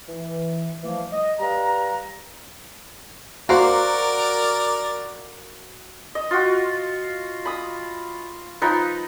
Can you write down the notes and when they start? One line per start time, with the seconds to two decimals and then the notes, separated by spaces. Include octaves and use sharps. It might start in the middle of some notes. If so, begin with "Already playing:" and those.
0.09 E3
0.83 E3 F3 G3 A3 A#3
1.13 D#5
1.40 G3 B4 F5 A#5
3.49 A#3 F#4 A#4 C5 D5
6.15 D#5
6.31 F4 F#4
7.46 B5 D#6
8.62 F3 D#4 B4